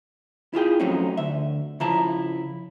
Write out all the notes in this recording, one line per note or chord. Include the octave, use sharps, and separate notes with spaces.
E4 F4 G#4 G5
F3 F#3 A3 C4 C#4 D#4
D2 E5
C#3 F3 E4 A5 A#5